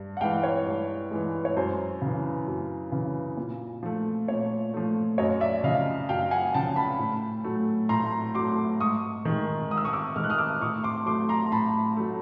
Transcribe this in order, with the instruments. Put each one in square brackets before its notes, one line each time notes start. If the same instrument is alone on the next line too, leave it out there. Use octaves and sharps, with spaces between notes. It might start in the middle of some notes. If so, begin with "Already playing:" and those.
Already playing: [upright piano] G2
F#5
E3 G#3 F5 G5
C#5
G2
E3 G#3
C#5
F#2 C5
C#3
E3
F#2
C#3 E3
A#2
F3 A3
A#2 C#5
F3 A3
F#2 C#5 D#5
D5 E5
C#3 D#5 F5
F3
F#2 F5 G5
F#5 G#5
C#3 F3 G5 A5
A5 B5
A2
F#3 A3
A2 A#5 C6
F#3 A3 C6 D6
G#2 C#6 D#6
D#3 G#3
G#2 D#6
E6
C#6 D#6
D6 E6
D#3 G#3 F6
F#6
D#6 F6
D6 E6
A2 C#6 D#6
C6 D6
F#3 A3 C6 D6
A#5 C6
A2 A5 B5
F#3 A3